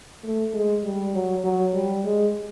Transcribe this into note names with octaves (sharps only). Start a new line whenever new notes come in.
A3
G#3
G3
F#3
F#3
G3
G#3